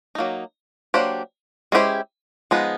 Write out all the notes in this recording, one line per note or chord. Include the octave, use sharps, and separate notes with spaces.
F#3 A#3 D#4
F#3 A#3 D4 G4 C5
G#3 C#4 E4 G4 C5
F3 G#3 B3 D#4